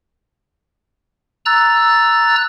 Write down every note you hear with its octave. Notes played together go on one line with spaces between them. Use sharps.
A#5 E6 F#6 A6